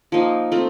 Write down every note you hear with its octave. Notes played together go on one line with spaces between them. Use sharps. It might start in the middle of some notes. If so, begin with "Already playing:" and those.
F3 A#3 D#4
A3 C4 F4